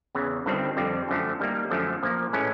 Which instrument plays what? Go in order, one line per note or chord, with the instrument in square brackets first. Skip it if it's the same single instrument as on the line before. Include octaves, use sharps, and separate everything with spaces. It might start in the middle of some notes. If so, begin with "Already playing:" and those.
[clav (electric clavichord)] E2 C#3 E3
G1 G2 D#3 G3 C4
F2 D3 G3 C4
F#2 D3 F3 A3
D#3 G3 A#3
F#2 D3 F3 A3
A#2 F3 A#3
A2 E3 G#3 C#4